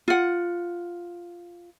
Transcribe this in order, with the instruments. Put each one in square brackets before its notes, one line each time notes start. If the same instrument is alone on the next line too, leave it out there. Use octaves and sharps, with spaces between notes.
[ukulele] F4 F#5